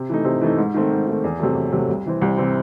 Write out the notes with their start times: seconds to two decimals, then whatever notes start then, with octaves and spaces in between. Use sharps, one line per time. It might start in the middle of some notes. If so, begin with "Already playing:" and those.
Already playing: C3
0.09 E3 A3 D#4
0.25 C3
0.41 E3 A3 D#4
0.58 G#2
0.74 D#3 A3 C4
0.91 G#2
1.07 D#3 A3 C4
1.24 E2
1.40 C3 F#3 A3
1.55 E2
1.72 C3 F#3 A3
1.89 C2
2.06 C3 E3 C4
2.21 C2
2.37 C3 E3 C4